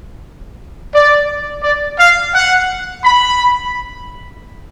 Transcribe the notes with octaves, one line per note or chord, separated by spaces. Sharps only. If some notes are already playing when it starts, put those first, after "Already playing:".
D5
D5
F5
F#5
B5